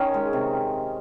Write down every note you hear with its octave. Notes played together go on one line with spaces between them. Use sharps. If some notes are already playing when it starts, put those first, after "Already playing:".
Already playing: D#3 C#4
G#3
C3